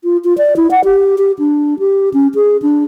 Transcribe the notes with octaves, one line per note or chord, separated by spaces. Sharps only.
F4
F4
D5
E4
F#5
G4
G4
D4
G4
C#4
G#4
D4